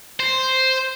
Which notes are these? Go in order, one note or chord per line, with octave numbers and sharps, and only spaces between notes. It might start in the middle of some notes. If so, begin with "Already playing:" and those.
C5